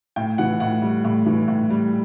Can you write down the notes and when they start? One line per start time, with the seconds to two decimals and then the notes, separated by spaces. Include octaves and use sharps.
0.16 A2 G5
0.38 E3 F#5
0.60 A2 F#5
0.82 G3
1.05 A2
1.26 E3
1.48 A2
1.70 G3